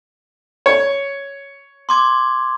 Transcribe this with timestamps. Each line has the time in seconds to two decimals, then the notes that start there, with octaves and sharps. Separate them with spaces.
0.66 C#5
1.89 C6 D6 G#6